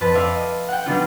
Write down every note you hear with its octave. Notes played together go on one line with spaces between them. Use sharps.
F2 B4 A5
A4 B4 D5 E5 F5
D#5
F#5 G5
F#3 G3 B3 D4 D#4 F4